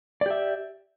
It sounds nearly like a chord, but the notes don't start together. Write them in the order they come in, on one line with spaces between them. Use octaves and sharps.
D5 G4 E5